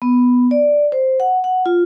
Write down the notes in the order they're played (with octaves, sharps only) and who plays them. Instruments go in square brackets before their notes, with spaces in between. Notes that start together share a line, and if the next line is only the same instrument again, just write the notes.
[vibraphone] B3
D5
C5
F#5
F#5
F4